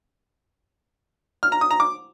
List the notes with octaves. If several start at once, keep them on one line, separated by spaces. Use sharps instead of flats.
F6
A#5
D#6
A#5
D6